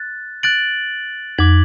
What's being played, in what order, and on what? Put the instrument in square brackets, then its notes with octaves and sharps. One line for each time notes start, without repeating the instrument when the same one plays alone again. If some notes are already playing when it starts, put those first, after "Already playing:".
Already playing: [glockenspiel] F#6 A6
F#6 A6 D7 F#7
[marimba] F2 [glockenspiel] D6 G#6 B6 F#7